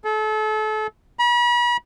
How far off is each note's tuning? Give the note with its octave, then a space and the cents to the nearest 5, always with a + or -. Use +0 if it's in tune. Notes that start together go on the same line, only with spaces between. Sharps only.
A4 -35
B5 -40